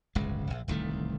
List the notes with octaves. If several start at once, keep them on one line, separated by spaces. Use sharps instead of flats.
D1 G1 C#2 G#3
A#1
D1 C2 D#3 A3